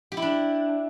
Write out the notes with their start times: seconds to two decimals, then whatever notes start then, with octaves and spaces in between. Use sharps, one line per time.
0.12 G4
0.17 E4
0.22 D4